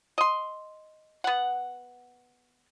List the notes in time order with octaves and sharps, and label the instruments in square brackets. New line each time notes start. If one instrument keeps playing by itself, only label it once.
[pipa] D#5 C6
B3 F#5